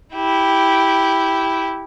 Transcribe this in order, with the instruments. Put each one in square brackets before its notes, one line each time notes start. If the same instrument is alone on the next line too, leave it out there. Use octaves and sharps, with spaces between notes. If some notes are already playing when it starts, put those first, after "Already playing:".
[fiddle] E4 G4